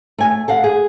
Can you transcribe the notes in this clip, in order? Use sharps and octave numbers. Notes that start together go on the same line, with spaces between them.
A3 G#5
A4 F5 F#5
G#4